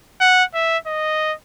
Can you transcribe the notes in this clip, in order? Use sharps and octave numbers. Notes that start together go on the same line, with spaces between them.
F#5
E5
D#5